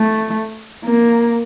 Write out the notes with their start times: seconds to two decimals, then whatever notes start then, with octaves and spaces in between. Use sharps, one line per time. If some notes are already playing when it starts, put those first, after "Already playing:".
Already playing: A3
0.85 A#3